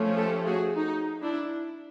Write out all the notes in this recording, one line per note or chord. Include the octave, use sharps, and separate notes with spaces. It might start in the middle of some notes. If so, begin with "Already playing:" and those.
Already playing: F3 A3 C#4
G4 A4
F#4 G#4
D#4
D4 E4